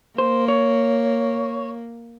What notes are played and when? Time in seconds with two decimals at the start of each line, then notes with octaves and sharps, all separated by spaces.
0.18 A#3 C5
0.48 C#5